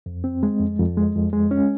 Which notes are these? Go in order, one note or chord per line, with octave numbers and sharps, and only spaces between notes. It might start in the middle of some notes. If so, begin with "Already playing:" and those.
F2
C4
G#3
F2
F2
G#3
F2
G#3
C#4